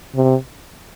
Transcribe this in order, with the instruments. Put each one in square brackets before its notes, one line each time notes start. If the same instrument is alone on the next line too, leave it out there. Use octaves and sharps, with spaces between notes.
[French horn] C3